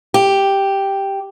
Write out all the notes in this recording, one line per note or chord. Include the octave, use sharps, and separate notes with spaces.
G4